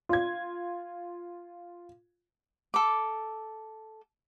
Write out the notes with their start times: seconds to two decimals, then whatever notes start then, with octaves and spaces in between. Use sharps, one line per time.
0.09 F4 G#6
2.74 A4 D6